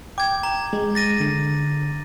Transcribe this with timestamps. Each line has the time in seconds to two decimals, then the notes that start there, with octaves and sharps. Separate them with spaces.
0.18 G5 D6 G#6
0.43 A#5
0.73 G#3
0.95 A6 A#6 D#7
1.20 D3